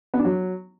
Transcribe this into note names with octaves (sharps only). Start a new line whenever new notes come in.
B3
D4
F#3